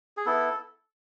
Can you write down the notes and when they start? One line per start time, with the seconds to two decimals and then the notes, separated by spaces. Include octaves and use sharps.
0.17 G#4
0.26 B3 E4 A4